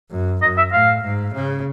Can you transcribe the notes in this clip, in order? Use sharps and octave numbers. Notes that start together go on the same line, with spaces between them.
F#2
F#2 D#5
E5
A2 F5
G#2
C#3